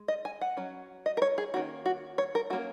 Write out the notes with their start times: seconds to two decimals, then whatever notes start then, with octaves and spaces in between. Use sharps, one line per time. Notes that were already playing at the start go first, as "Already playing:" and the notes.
Already playing: G#3
0.08 D#5
0.25 G#5
0.41 F#5
0.57 F#3 C#4
1.06 D#5
1.17 A#4
1.22 C#5
1.38 G#4
1.54 D#3 A#3 C#4 F#4
1.86 F#4
2.18 C#5
2.35 A#4
2.50 F#3 A#3 C#4 F#4